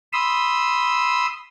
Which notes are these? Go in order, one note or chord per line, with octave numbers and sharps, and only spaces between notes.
B5 C6 D#6 E6